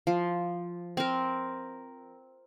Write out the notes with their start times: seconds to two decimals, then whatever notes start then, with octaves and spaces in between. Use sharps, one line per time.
0.07 F3
0.97 C4 A#4